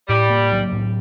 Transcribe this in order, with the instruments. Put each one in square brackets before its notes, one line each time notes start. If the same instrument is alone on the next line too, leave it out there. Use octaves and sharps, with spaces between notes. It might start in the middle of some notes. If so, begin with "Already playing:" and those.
[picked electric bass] A2 [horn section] G3
[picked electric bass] A#3
F#3
A2